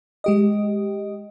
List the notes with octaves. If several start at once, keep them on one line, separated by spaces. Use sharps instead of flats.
G#3 G4 D#5